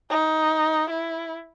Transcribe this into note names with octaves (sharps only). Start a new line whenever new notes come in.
D#4
E4